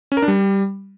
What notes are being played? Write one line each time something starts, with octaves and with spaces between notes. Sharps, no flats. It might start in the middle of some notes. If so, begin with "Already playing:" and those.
C#4
A#4
D4
G3